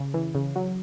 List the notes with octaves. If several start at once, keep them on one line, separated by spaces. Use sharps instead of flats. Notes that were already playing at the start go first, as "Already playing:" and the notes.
Already playing: C#3
E3
C#3
F#3